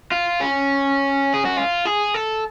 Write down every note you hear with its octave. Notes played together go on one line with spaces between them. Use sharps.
F4
C#4
G#4
F#4
F4
G#4
A4